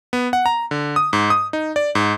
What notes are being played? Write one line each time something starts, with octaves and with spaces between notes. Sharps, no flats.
B3
F#5
A#5
D3
D#6
G#2
D#6
D#4
D5
G#2